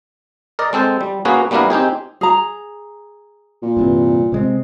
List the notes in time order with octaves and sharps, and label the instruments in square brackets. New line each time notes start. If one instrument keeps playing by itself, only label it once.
[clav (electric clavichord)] A#4 D5 D#5
G#3 C4 A4 C5
G3
A#3 C#4 F#4 G#4 B4
G3 A#3 B3 D4 E4 A#4
C4 D#4 G4 G#4
[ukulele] G#4 A#5
[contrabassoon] A#2
[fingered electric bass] G2 C3 E3
C3 G#3 C4